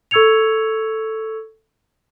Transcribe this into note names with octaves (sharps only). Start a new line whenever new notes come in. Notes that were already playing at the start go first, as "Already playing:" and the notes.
A4 C#6 E6 G#6 C#7 F7